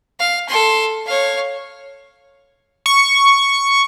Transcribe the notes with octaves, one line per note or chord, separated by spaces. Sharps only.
F5
A4 C6
C#5 F5
C#6